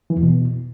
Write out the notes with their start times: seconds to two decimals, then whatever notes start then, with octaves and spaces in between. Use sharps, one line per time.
0.10 E3
0.16 E2
0.23 B2